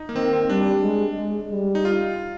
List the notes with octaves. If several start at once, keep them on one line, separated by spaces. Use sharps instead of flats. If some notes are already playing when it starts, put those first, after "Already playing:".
Already playing: D#4
A#3
D#3 C4
C4
G3 D4
G#3
G#3
G3
D#4
F4